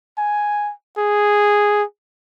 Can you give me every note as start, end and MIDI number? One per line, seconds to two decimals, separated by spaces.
0.18 0.72 80
0.98 1.83 68